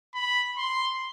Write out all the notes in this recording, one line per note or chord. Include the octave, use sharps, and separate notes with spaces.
B5
C6